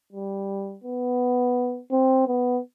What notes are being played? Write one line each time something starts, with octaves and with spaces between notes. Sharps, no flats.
G3
B3
C4
B3